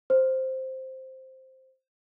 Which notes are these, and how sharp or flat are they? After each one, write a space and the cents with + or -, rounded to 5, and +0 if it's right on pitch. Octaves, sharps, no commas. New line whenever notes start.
C5 +0